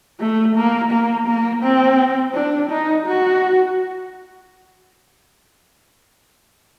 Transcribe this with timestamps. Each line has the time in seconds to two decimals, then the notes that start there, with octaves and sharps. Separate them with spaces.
0.20 A3
0.56 A#3
0.91 A#3
1.27 A#3
1.63 C4
2.34 D4
2.70 D#4
3.06 F#4